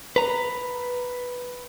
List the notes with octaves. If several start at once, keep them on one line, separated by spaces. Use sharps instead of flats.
B4 A#5